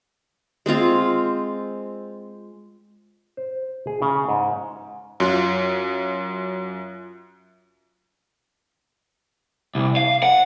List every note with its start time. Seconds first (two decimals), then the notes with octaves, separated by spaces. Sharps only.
0.66 G#3 C4 F4 F5
3.37 C5
3.87 G#4
4.02 C#3
4.28 G#2
5.20 F#2 F4
9.75 C2
9.97 F5
10.23 F#5